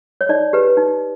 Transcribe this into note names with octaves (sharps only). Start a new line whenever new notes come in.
C#5
D#4 D5
G4 B4
D#4